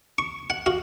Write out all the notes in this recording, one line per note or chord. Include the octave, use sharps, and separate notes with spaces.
C#6
F#5
F#4 F5